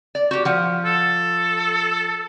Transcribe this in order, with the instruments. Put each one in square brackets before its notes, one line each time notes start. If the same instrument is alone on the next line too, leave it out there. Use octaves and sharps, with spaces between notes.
[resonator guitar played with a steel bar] D5
F#4 G4
F3 F#5
[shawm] A4